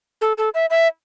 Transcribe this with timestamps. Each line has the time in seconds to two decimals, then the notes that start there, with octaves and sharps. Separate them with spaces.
0.21 A4
0.38 A4
0.54 E5
0.70 E5